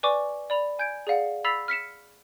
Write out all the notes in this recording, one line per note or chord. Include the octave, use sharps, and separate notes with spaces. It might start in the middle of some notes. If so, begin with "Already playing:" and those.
B4 D5 G#5 C#6 D6
D5 B5 F7
G#5 G6 G#6 D7
G#4 D5 F5 F#5
B5 E6 A6 B6 C7 F7
F6 B6 C#7 E7